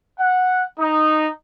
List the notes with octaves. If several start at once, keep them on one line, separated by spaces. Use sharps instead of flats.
F#5
D#4